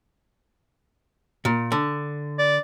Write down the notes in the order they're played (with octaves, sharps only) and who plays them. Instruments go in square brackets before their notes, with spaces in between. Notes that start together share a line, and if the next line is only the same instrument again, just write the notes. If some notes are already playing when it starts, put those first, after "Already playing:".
[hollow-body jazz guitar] A#2
D3
[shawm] D5